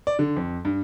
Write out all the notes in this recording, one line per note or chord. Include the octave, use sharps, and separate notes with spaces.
D5
D3
F2
G2